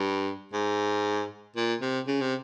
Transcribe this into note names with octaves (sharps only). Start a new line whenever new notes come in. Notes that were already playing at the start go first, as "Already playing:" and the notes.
Already playing: G2
G#2
A#2
C3
C#3
C3